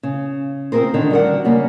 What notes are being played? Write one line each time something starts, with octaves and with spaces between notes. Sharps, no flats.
C#3
C4 F4 G#4 A#4 C5
D3 D#3 C#4
G3 F#4 A#4 F#5
C#3 G3 A#3